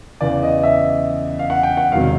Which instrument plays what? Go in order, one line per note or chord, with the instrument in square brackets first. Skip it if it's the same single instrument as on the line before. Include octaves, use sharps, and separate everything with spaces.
[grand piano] E2 C#3 E3 D5
D#5
E5
F5
F#5
G5
F#5
E1 C3 D#3 F#3 F5